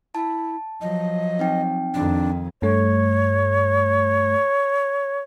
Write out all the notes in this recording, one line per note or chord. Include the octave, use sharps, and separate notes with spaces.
E4 A5
F3 F#3 D#5
C4 D#4 G5
F2 D#3 D4
G2 A3 C#5